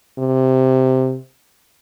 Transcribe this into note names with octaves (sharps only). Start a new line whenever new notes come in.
C3